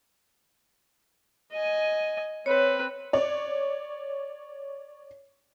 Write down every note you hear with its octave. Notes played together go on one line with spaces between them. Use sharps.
D#5 G#5
C4 B4 C#5
C#5 D5